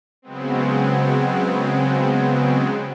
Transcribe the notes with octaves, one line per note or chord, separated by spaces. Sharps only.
C#3 F#3 G#3 B3 C4